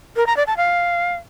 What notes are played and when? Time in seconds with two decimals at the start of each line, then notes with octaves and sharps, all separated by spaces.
0.16 A#4
0.26 A#5
0.37 D5
0.47 A5
0.57 F5